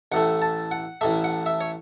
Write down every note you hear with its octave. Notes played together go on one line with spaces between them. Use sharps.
A1 A2 A3 F#5
A5
F#5
A1 A2 A3 E5
F#5
E5
C#5